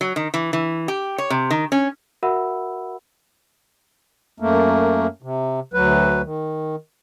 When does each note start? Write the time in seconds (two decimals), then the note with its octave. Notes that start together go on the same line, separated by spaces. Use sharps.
0.01 F#3
0.16 D#3
0.34 E3
0.53 E3
0.88 G4
1.18 C#5
1.30 C3
1.51 D#3
1.72 C#4
2.23 F#4 A#4 E5 F#5 B5 E6
4.40 F#2 A3 A#3
5.22 C3
5.74 D2 F#3 B4
6.23 D#3